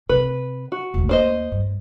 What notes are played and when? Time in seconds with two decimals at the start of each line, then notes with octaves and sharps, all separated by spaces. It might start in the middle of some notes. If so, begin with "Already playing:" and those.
0.09 C3 C4 B4
0.72 F#4
0.94 E1 D2
1.09 D#2 D4 C5 D#5
1.52 G2